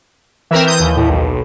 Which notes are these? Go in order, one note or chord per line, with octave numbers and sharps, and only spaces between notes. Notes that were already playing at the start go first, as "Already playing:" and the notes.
E3 C4 A#4 E5
D#6 G6
D#2
A2
B1